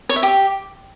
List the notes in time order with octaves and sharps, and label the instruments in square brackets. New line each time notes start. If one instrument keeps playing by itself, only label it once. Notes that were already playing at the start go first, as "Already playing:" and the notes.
[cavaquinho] C#5
E5
G4